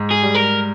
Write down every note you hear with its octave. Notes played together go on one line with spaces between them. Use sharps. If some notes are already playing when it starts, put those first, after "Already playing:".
Already playing: G#2
G#4
G3
A#4